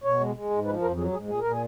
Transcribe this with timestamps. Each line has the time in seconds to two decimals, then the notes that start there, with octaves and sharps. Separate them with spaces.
0.04 B2 C#5
0.20 G#3
0.35 G#3
0.51 G#2
0.66 F3 B4
0.82 F2 A#4
0.97 F#3 G#4
1.12 G#2 G#4
1.28 A#2 G#4
1.40 A#2 A#4
1.50 G#4